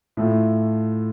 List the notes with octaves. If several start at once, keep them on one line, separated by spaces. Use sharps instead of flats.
A2 A3 F4